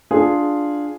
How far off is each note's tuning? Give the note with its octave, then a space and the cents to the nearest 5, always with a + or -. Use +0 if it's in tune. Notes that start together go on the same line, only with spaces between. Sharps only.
D4 +0 F4 +0 G#4 +0